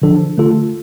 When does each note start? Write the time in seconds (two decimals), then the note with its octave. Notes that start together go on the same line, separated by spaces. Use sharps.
0.02 D3 F3 D4 A4
0.37 D3 A3 F4 A4